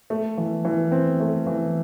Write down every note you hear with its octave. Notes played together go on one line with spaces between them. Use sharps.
A3
E3
E3
C4
A3
E3